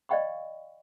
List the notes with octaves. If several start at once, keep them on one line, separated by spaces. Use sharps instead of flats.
D5 D#5 F5 G5 B5 C#6